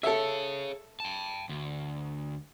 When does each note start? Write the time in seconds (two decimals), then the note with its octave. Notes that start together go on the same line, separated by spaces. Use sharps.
0.03 G#4 A4 C#5 E5
1.00 G5 A5
1.49 D2